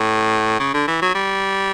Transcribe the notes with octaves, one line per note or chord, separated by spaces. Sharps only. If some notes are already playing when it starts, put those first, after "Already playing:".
Already playing: A2
C#3
D3
E3
F#3
G3